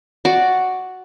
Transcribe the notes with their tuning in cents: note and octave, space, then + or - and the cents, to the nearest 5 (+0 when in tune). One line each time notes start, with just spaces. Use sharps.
F#4 +0 D5 +0